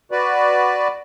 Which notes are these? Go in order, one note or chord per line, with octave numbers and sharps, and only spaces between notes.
F#4 B4 D5